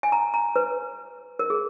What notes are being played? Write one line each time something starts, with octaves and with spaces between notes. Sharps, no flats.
G#5
A#5
A#5
B4
A#4
G#4